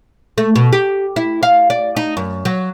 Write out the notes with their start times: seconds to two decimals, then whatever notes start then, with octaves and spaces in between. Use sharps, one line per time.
0.38 A3
0.56 B2
0.73 G4
1.16 E4
1.43 F5
1.70 D5
1.96 D#4
2.17 F#2
2.45 F#3